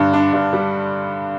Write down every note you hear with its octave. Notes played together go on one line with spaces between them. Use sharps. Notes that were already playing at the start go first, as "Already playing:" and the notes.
Already playing: G2 D3 D4
D4
G2
G3